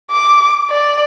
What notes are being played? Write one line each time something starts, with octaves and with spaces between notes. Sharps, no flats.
D6
D5